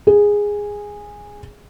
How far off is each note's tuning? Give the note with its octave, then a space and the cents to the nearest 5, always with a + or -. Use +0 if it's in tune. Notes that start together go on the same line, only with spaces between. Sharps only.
G#4 -10